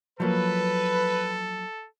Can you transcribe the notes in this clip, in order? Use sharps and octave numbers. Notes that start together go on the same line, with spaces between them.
F3 F#3 A#3 A4 B4